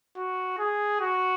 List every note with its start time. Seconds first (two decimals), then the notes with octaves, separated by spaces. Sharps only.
0.17 F#4
0.59 G#4
1.01 F#4